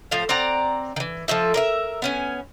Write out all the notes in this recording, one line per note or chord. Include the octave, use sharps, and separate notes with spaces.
A2 F3 C5 F5
C4 D5 F#5 A#5
D#3 E3
F3 A3 D#4 E4
A#4 D5 E5
B3 C#4 G#5